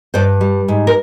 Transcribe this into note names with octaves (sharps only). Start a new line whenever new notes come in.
G2 C5 D5
G3
G#2
A#4